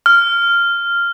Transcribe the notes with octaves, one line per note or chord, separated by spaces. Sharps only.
F6